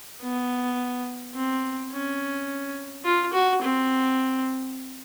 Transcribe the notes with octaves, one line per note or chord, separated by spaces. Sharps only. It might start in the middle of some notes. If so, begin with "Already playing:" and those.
B3
C4
C#4
F4
F#4
C4